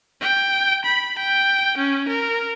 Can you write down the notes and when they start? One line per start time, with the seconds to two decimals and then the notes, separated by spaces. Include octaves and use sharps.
0.21 G5
0.85 B5
1.19 G5
1.78 C#4
2.09 A#4